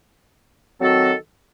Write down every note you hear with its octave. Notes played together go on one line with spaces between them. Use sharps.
D#3 F#3 C4 F#4 A4